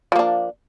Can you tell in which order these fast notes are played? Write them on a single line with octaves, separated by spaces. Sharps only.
F3 A#3 D4